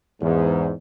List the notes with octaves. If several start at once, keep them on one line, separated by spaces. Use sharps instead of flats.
E2 G#2